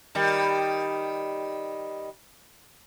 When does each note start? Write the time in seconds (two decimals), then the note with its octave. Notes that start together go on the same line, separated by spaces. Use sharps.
0.15 D#3 G3